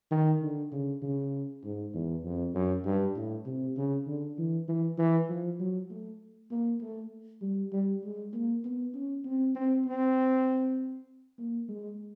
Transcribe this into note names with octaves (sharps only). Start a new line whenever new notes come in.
D#3
D3
C#3
C#3
G#2
E2
F2
F#2
G2
A2
C3
C#3
D3
E3
E3
E3
F3
F#3
A3
A#3
A3
G3
G3
G#3
A#3
B3
C#4
C4
C4
C4
A#3
G#3